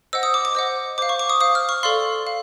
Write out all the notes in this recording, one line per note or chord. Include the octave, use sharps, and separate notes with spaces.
C5 D#5 F#5 E6
D#6
D6
D6
C5 D#5 F#5
C5 F5 D6
C#6
D6
D#6
C5 F5 D#6
F6
C#6
A4 D5 F5 C6
F5